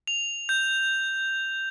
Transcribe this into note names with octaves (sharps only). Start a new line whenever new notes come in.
F7
G6